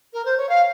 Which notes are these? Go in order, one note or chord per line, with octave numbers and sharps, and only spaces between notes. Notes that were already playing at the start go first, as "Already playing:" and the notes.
A#4
C5
C#5
F5